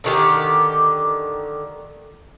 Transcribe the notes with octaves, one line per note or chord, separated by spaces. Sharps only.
D3 D#3 G4